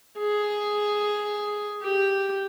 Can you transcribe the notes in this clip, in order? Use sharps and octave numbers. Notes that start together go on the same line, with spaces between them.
G#4
G4